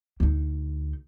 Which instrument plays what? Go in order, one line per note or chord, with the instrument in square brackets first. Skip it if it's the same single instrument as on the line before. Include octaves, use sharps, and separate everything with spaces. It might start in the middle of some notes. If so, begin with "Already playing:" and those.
[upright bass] D2 D#4